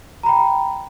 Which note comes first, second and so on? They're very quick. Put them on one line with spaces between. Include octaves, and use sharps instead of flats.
A#5 B5 G5